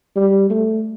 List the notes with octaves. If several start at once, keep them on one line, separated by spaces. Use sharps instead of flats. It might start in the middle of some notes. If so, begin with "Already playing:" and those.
G3
A3